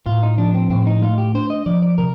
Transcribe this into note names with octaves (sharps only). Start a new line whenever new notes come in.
A2 F4
D#4
F3 D4
C4
A2 C4
D#4
A3 F4
G4
D4 C5
D#5
F3 D5
D5
C3 A#4